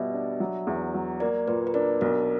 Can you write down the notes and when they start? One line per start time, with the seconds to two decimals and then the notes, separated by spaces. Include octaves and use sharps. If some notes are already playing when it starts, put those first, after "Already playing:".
Already playing: B2 G3 E5
0.13 D4
0.40 F#3
0.67 E2
0.94 F#3
1.20 A#3 D5
1.48 A#2 B4
1.67 B4
1.74 D4 A#4
2.01 B1 A#4